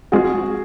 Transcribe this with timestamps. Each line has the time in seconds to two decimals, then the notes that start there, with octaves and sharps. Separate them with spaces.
0.12 F3 G#3 C4 F4 F#4 G#4